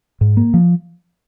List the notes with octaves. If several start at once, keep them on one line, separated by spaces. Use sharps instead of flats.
G#2
A#3
F3